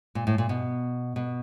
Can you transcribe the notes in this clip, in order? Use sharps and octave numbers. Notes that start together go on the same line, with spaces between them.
A#2
A2
A#2
B2
B2